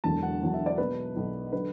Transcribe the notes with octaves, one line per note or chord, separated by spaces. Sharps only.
E1 E2 D3 F#3 A5
F#5
E1 E2 D3 F#3 F#5
E5
D5
B1 B2 F#3 B4
B1 B2 F#3
D3 F#3 B4